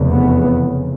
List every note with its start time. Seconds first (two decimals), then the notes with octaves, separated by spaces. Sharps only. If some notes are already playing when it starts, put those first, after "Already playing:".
Already playing: F1 E2 C#3
0.13 B3